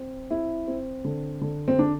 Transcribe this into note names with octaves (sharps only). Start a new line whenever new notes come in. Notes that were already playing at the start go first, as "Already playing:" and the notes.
Already playing: C4
C4 E4
C4
D3
D3
C4
D3 D4